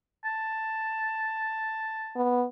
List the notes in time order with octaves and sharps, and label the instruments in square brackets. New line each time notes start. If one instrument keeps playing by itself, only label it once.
[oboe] A5
[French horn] B3